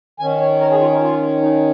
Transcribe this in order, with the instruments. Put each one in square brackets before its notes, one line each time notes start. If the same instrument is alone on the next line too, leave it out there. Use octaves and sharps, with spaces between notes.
[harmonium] D#3 C#4 G#5
C#5
A#4
G#4
F4
D#4
F4
D#4